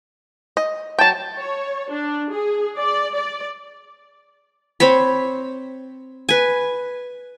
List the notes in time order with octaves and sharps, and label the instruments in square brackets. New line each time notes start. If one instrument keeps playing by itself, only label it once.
[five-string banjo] D#5
[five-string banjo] F#3 G5 [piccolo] A5
[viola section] C#5
D4
G#4
D5
D5
[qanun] C4 C5 C#5 B5
B4 G#5